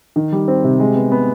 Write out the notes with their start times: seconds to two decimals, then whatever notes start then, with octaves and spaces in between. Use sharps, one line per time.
0.16 D#3
0.32 G3
0.48 C4
0.64 C3
0.80 G#3
0.96 B3
1.12 B3